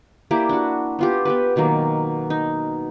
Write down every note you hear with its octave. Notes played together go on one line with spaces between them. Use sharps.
A#3 E4 G4 D5
D4 F#4
B3 F4 G4
B3 G4 B4
B2 D#3 F#3 A#3
D#4